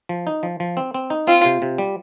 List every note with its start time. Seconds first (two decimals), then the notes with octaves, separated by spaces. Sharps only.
0.09 F3
0.27 D#4
0.43 F3
0.60 F3
0.77 C4
0.94 C4
1.10 D#4
1.27 C4 F4
1.45 C3
1.62 C3
1.78 G3